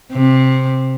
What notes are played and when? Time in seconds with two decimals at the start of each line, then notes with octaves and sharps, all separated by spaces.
0.13 C3